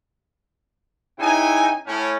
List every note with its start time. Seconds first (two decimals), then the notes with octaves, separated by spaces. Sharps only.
1.19 C#3 D#4 E4 G5 G#5
1.87 A2 C#4